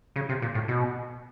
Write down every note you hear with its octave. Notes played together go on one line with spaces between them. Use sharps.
C#3
C3
A#2
A2
B2